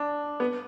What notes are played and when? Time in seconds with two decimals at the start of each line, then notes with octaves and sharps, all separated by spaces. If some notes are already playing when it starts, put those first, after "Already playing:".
Already playing: D4
0.40 B3